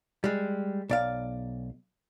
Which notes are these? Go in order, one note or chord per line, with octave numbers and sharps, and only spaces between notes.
G3 G#3
B1 D5 F5